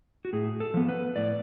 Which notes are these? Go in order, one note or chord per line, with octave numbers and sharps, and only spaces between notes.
F#4
A2 G#4
A4
F3 B3
B4
A2 D5